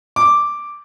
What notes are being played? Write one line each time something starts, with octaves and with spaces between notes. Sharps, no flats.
D6